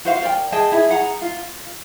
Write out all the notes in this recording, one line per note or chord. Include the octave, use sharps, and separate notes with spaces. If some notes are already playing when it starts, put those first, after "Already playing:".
F#4 C5 F5
A#4 D5 G5
G#4 D#5 G5 A5
E4 G#4
G#4 F#5 A#5
F4